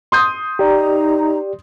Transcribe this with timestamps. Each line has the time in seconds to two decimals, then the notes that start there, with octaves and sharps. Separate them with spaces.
0.12 C6 D#6 G6
0.59 D#4 G4 D5 A#5